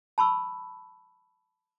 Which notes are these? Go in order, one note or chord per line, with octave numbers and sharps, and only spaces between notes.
A5 B5 C#6 E6